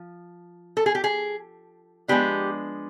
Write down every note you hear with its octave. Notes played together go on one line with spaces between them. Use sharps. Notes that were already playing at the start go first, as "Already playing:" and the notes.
Already playing: F3
A4
G#4
G4
G#4
F3 G#3 B3 D4 G4